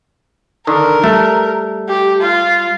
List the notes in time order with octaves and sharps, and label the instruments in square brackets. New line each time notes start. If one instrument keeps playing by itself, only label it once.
[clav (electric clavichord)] D3 D#3 [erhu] A#4
[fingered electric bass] G3 [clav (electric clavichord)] A3
[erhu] G4
F4